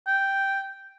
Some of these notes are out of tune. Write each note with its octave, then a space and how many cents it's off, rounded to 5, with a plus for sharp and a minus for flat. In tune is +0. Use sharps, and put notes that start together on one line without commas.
G5 -5